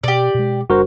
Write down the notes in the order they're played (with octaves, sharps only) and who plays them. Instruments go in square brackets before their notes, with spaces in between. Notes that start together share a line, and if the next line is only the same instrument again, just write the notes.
[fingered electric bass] B2 [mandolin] G4 D5
[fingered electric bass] B2 G#3
[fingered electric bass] F#1 G3 D4 [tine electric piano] F#4 A#4 C5